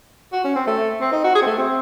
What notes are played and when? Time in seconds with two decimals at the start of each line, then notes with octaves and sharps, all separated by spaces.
0.32 F#4
0.44 C#4
0.55 C4
0.67 A3
1.01 C4
1.12 D#4
1.24 F#4
1.35 G#4
1.42 C4
1.47 A3
1.58 C4